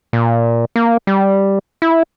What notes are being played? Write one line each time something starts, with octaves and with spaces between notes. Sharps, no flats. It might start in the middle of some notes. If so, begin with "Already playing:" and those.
A#2
A#3
G3
E4